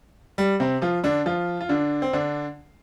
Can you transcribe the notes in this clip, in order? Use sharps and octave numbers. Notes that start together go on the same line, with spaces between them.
G3
C3 C4
F3 F4
D3 D4
F3 F4
F4
D3 D4
C4
D3 D4